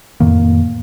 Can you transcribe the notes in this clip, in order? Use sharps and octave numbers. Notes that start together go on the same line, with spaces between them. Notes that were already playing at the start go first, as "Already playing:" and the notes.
F2 A2 D#3 A#3